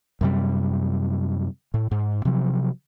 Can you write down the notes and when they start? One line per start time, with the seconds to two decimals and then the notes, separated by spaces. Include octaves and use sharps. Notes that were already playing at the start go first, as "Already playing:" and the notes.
0.21 F#2 C3 G3
1.74 A2
1.91 G#2
2.25 C3 F3 F#3